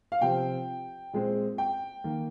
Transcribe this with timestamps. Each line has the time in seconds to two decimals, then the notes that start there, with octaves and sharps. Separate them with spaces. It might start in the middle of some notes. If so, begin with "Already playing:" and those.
0.12 F5
0.21 C3 F3 C4 G5
1.13 A#2 G#3 C4
1.58 G5
2.04 D#3 A#3